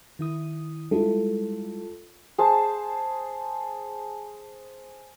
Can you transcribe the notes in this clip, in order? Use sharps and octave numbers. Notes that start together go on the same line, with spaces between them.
D#3 E4 D#6
G3 G#3 E4 F4 A4
G#4 C5 A5